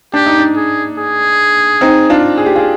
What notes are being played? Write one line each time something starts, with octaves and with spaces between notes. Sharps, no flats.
D4 G4
D#4
D4
G#4
G#4
C4 D#4
D4 F4
G#4
G4
F4 G#4